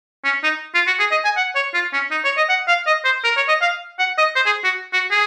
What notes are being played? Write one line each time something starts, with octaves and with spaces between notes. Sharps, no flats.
C#4
D#4
F4
F#4
G#4
D#5
G#5
F#5
C#5
F4
C#4
D#4
C#5
D#5
F#5
F5
D#5
C5
A#4
C#5
D#5
F5
F#5
D#5
C5
G#4
F#4
F#4
G#4